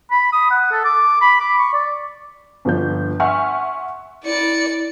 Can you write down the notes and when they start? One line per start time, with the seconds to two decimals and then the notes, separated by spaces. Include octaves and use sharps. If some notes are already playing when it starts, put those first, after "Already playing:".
0.11 B5
0.33 D#6
0.51 F#5
0.72 A4
0.85 D6
1.21 B5
1.40 D6
1.59 C#6
1.74 D5
2.65 G1 F3 G6
3.20 E5 F#5 G#5 C6 C#6 F6
4.25 E4 D5 C#7